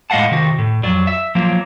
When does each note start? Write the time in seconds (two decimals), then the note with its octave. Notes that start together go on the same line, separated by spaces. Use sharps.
0.10 A2 G#3 D#5 F5 F#5 A5
0.31 C3 D#3 F#4
0.58 A2
0.83 F2 F#3 D5
1.07 E5
1.35 F3 F#3 A#3